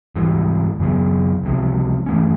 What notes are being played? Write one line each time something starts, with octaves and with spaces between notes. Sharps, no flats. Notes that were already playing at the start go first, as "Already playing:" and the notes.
G#2 E3 G3
F#2 C#3 F#3 B3
C#2 C3 F3
G2 E3 A3 C#4